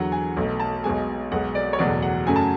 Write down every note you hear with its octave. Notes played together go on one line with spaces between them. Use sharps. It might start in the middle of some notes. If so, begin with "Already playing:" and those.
Already playing: E2 D3 F#3 F#5
G#5
B1 B2 A3
A5
B1 B2 G#3 G#5
B1 B2 G#3 F#5
D5
C#5
F#1 E2 B2 F#3 A3 D5
F#5
F#2 C#3 F#3 A3 G#5
A5